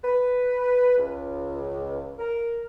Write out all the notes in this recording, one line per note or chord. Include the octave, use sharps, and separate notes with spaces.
B4
C#2
A#4